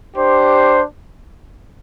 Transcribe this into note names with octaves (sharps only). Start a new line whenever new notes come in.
D4 G4 C5